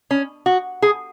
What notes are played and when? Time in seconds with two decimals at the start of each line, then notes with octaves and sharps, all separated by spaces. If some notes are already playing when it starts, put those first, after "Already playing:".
0.11 C#4
0.46 F#4
0.82 G#4